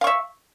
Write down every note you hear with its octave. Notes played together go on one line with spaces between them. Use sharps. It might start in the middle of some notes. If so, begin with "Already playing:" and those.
E5 F5 C#6